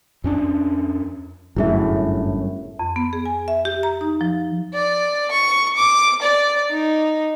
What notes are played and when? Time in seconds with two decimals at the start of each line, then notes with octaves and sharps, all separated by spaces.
0.24 F2 C#4 D4
1.56 G1 F#2 A2 E4 G#4 E5
2.79 F2
2.96 B3
3.13 G#4
3.25 G#5
3.48 E5
3.65 G4
3.83 A#5
4.01 D#4
4.21 F3
4.74 D5
5.31 C#6
5.76 D6
6.22 D5
6.70 D#4